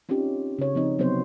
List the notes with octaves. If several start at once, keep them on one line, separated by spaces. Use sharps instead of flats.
C4 C#4 D#4 F4 G4
C#3 C#5
F3 C4 D#4
C3 F#3 B3 C4 C5